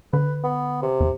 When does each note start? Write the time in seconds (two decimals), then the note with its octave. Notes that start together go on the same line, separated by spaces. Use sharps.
0.13 D3 B4
0.44 B3
0.83 C3
1.00 E2